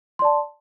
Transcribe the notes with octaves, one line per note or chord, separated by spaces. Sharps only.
D5 A5 C6